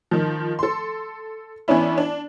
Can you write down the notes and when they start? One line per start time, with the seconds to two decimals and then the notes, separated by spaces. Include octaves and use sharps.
0.11 D#3 F3
0.59 A4 C6
1.68 E3 B3 C#4 D4 E4
1.98 D4